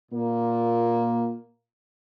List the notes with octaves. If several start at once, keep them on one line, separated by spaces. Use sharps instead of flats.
A#2 A#3